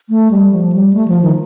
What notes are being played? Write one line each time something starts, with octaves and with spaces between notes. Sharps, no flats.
A3
G3
F3
G3
A3
F3
D#3